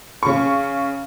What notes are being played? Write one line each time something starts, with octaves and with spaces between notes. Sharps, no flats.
C#3 C#6